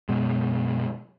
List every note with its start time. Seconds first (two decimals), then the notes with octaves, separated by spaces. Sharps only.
0.09 F#2 B2 G#3